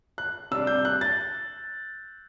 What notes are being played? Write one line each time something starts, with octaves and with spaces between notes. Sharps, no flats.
F#6
C3 G3 D4 E6
G6
F#6
A6